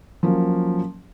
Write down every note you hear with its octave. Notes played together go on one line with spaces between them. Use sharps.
F3 F#3 A#3 C#4